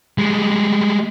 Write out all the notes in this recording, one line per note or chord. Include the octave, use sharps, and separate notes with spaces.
G3 G#3